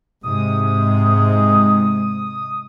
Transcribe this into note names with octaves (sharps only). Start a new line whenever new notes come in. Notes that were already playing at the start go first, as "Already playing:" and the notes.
G#2 C3 G#3 D#6